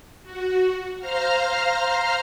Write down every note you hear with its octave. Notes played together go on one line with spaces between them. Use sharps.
F#4
C5 F5 A#5 F6